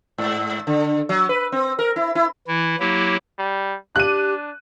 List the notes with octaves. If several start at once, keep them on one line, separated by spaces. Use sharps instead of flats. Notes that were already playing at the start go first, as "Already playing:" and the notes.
G#2
D3
F#3
B4
C4
A#4
E4
E4
E3 E4
F#3 A#3 E4 G4
G3
D4 G4 F#6 D#7